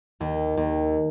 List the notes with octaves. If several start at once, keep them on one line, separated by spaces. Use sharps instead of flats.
D#2
D#2